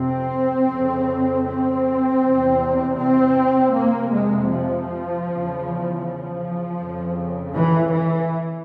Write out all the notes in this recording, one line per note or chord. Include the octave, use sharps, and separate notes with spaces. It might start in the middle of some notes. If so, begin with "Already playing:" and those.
Already playing: F2 C3 C4
F2 C#3
C4
E2 C3
C4
F2 C3 A#3
G#3
F3
E2 C#3
F3
F2 C#3
E3
E3